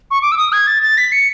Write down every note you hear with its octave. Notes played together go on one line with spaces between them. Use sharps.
C#6
D6
E6
D#6
G#6
A6
A6
B6
C#7